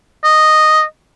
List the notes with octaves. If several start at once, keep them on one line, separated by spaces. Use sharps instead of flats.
D#5